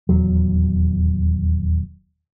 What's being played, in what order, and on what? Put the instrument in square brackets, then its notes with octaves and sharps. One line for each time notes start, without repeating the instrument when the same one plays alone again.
[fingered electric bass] D#1 E2 F#3